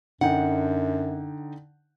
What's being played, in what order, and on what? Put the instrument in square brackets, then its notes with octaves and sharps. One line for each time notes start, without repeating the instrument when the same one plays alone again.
[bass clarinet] F#2 [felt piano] D3 D#4 G5 [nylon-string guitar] F#5